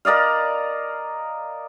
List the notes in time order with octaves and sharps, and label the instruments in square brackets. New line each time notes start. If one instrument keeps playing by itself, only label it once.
[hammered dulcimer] A#4 D5 D#5 F5